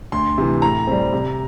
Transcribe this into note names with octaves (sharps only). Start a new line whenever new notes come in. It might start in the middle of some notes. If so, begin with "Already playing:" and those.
D2 C6
C3 E3
A2 A#5
G3 C4
C3